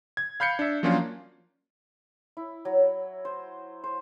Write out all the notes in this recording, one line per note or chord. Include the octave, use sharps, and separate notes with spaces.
G#6
F5 B5 G6 C7 C#7
D4 E5
F3 F#3 A#3 C#4 D4 F4
E4
F#3
C5
C5